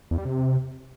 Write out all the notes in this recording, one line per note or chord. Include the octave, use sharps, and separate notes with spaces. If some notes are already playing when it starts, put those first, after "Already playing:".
E2
G3
C3